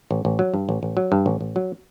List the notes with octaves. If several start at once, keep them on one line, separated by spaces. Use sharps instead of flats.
A1
A1
F#3
G2
A1
A1
F#3
G2
A1
A1
F#3